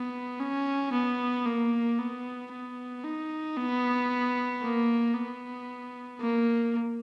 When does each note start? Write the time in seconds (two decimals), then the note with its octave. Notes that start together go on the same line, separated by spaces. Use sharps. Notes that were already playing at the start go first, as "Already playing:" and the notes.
Already playing: B3
0.40 C#4
0.93 B3
1.46 A#3
1.99 B3
2.52 B3
3.04 D#4
3.57 B3
4.62 A#3
5.15 B3
6.21 A#3